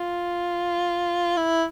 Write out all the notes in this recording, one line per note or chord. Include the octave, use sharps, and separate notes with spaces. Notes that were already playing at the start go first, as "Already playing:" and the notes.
Already playing: F4
E4